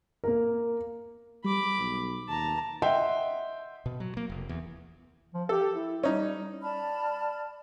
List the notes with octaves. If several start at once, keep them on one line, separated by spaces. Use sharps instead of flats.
A#3 A#4
G3 B5 D6
B1
D#2 A5 A#5
D#5 E5 F#5 G5 C6
B2
F#3
A#3
F1
E2
F3
G4 A4
E4
G3 C#4 D#4
D5 A5 B5 F6